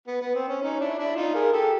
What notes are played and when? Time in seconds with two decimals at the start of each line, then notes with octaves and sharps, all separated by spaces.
0.07 B3
0.21 B3
0.35 C4
0.48 C#4
0.62 C#4 D#4
0.80 D4 E4
0.98 D4 E4
1.16 D#4 F4
1.34 G#4 A#4
1.53 G4 A4